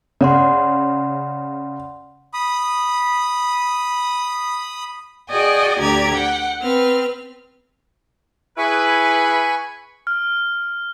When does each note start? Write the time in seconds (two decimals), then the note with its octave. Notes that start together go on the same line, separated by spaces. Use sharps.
0.21 C#3 D5 F#5 C6
2.34 B5 D#6
5.30 F#4 G#4 D5 D#5 G5 G#5
5.80 D2 D3 G4 D5 A#5 G#6
6.13 F#5 G5
6.61 C4 B4 F6
8.58 E4 G#4 B4 G#5 B5 C#6
10.07 F6